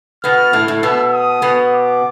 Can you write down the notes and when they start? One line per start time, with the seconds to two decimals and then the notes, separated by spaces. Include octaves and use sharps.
0.24 B2 B3 F6
0.53 A2 A3
0.68 A2 A3
0.82 B2 B3 E6
1.13 D#6
1.42 B2 B3
1.71 D6